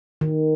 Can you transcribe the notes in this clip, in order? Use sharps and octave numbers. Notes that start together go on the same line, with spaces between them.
D#3